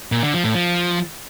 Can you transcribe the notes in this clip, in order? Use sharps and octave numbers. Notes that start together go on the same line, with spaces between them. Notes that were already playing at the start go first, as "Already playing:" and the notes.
A#2
D3
F3
A2
F3